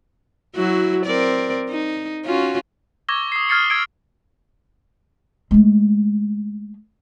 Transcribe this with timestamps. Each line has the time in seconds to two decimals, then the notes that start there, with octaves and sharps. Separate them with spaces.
0.55 F#3 E4 F#4
1.06 C4 A#4 D5
1.70 D#4
2.26 C#4 F4 F#4
3.09 C#6 D6 E6 G#6 A#6 G7
3.32 D#6 C7
3.49 D#6 F6 G#6 A6 C7 C#7
3.70 E6 G#6 C#7 D7
5.51 G#3 A3